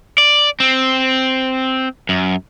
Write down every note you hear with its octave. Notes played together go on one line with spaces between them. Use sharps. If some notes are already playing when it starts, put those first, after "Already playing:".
D5
C4
F#2